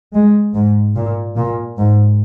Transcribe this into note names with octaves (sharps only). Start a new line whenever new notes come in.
G#3
G#2
A#2
A#2
G#2